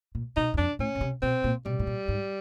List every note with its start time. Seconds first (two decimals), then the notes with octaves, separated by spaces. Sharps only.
0.15 A#2
0.36 B2 D#4
0.54 F#2
0.57 F2 D4
0.79 A2 C#4
0.95 B2
1.01 C3
1.22 B2 C4
1.44 A#2
1.65 B2 G3
1.79 A2
1.87 A#2
2.08 G#2